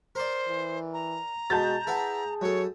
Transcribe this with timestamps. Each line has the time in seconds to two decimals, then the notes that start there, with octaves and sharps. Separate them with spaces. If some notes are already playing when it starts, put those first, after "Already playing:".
0.15 A#4 C5 D5
0.48 E3
0.93 A#5
1.50 B2 G#3 A5 G6 A6
1.87 E4 G#4 B4 F#5
2.41 F#2 A4 C#5